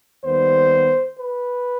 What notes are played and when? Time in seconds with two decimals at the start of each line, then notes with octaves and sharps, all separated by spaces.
0.24 D#2 D#3 G3 B3 C5
1.19 B4